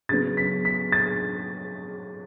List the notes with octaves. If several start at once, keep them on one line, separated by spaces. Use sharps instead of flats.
C#3 F#3 B3 A6
B6
B6
A6